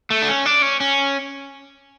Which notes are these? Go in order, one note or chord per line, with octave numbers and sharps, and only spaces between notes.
A3
D4
C#4
D4
C#4
C#4